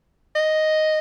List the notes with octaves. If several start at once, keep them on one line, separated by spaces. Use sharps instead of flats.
D#5